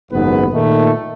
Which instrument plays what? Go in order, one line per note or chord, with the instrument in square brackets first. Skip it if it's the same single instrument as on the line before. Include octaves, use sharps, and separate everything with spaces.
[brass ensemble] F#1 D#2 G#2 B3 B4
A#2 D#3 A3